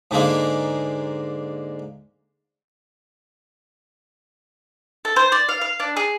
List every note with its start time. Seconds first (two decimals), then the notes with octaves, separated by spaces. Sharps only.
0.11 G#2 D3 G#3 A#3
5.05 A4
5.16 C5
5.32 D5
5.49 F5
5.61 F5
5.80 D4
5.97 G#4